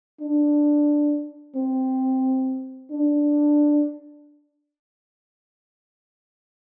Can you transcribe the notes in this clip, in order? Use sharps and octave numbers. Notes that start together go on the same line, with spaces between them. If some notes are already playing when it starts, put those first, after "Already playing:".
D4
C4
D4